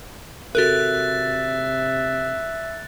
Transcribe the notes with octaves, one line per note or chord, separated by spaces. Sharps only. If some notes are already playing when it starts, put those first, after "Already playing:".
C3 F#4 A4 A#4 E5 F#6 A6